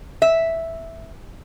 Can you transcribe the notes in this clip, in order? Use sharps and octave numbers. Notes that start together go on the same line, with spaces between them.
E5